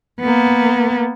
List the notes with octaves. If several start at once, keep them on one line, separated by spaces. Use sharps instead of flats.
A#3 B3